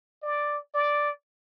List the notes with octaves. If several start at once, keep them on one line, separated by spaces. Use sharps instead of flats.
D5
D5